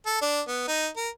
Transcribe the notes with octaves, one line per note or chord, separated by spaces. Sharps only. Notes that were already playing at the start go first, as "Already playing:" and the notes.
A4
D4
B3
D#4
A#4